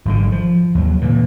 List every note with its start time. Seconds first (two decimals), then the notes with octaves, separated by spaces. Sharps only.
0.05 G#1 F#2 B2 D3
0.32 F3
0.75 D#2 F#3
1.01 A#2 D3 E3